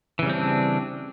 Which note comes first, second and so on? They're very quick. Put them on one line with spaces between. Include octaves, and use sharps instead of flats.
E3 C#3 G3 C4 D4